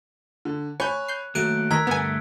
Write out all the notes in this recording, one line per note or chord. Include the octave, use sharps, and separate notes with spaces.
D3
C#5 G#5 B5 C#6 F#6 G6
G6 C7
D#2 F#3 A3 F#6 D7 D#7
D#3 A#4 E6 G#6 B6
D2 G2 A3 B3 G#5